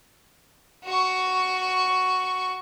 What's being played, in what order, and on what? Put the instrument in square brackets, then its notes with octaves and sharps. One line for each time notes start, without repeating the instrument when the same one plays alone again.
[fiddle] F#4 C#6